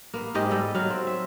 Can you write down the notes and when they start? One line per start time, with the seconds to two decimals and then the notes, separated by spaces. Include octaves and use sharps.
0.14 A#3 B3
0.34 G#2 G#3 G4 D#5
0.51 G3 A4 D#5
0.74 F#3 F5
0.90 C4
1.07 E5